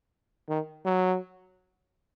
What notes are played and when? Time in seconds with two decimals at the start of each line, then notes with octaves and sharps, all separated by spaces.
0.49 D#3
0.85 F#3